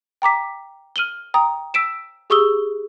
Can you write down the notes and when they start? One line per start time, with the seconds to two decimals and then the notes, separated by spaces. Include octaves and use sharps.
0.22 G5 A#5 D6 B6
0.96 F6 D#7 F#7 G7
1.34 G5 A#5 D#6
1.74 E6 B6 D7 E7
2.30 G4 G#4 C#6 D#6 E6 G7